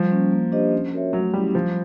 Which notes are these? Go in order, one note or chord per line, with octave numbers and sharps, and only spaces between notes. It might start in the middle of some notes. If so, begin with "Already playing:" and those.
Already playing: F3 G3
A#3 C#4
A#3
D4 G4 C5 D#5
C#4
F#4 A#4 C#5 E5
F#3 A3
G3 C#4 E4 G4
F3 G3